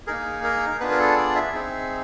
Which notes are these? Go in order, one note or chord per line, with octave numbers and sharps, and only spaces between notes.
A#3 D#4 G#4 A#4
A#4
B3 D4 F4 G#4 B4
A#4
A4
D5
E5
C4 D#4 G#4